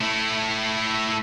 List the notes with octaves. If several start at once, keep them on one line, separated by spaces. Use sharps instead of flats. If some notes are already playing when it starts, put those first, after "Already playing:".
A3 E4